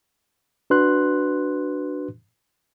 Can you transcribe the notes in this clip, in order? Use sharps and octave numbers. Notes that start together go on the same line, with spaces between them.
D4 F#4 B4 C6 F#6